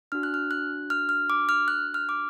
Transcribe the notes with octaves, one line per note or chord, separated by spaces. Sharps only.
D4 F#4 F6
F#6
F6
F#6
F6
F6
D6
F6
F#6
F6
D6